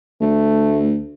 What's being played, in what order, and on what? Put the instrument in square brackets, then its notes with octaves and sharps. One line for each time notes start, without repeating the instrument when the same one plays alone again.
[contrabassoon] D2 [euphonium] A3